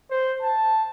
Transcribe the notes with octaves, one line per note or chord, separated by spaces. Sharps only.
C5
A5